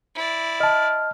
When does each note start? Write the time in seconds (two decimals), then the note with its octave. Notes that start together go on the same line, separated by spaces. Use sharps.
0.15 E4 D5
0.60 D#5 A5 F6